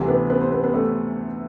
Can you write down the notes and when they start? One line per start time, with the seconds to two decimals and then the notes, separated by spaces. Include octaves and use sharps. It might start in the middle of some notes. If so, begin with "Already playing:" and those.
Already playing: D2 C3 E3 G3 G4
0.08 B3 B4
0.30 B3 B4
0.41 C4 C5
0.52 B3 B4
0.63 B3 B4
0.74 A3 A4